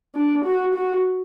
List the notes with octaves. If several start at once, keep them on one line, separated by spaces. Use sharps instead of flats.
D4
F#4
F#4